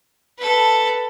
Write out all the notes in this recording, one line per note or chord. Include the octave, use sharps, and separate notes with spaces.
A4 B4